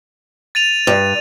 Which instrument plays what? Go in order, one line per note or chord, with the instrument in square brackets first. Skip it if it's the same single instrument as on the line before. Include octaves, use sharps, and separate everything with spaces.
[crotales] A6 D#7 F7
[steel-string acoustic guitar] G2